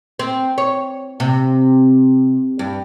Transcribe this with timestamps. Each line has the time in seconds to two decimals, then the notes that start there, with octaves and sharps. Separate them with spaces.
0.19 C4
0.58 C#5
1.20 C3
2.59 G2